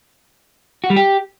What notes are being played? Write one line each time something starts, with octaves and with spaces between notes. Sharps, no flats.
F#4
G3
G4